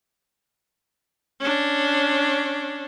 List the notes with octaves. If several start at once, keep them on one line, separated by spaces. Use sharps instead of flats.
C#4 D4